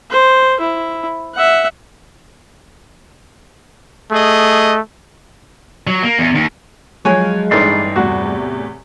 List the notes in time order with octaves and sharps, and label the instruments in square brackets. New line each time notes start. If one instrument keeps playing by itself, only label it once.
[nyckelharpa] C5
E4
E5 F#5
[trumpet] A3 [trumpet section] G#4 D#5
[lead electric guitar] F#3
A#3
E2
D#2
[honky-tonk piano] F3 F#6 [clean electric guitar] F#3 [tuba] G#3 [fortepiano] C#5 G#5
[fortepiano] A1 D#4 [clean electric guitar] G2 D5 C6 [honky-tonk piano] D4 B4 C#5
[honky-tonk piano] E2 A2 G3 [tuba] C3 [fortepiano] F#4